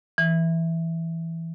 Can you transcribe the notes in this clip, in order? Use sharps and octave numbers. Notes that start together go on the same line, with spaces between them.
E3